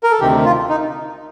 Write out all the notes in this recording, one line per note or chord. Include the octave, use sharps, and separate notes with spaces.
A#4
A4
D2 C3 D#3 G4
F4
D#4